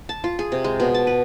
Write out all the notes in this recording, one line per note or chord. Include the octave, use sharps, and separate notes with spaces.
A5
F4
G#4
C3
G#3
B2
A5
B4